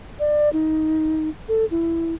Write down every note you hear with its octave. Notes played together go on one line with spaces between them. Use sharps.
D5
D#4
A4
E4